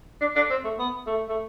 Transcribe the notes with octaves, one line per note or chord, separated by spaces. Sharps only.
D4
D4
C4
A3
B3
A3
A3